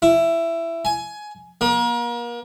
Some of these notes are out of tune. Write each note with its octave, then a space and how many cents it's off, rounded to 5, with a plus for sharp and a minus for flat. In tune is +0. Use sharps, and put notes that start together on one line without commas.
E4 +15
G#5 +15
A#3 +35